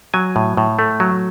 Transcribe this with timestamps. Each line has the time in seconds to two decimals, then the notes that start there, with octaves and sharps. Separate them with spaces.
0.14 F#3 G#5
0.36 A2
0.57 A2
0.79 A3
1.00 F#3